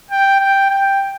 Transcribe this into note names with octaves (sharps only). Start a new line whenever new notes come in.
G5
G5
G5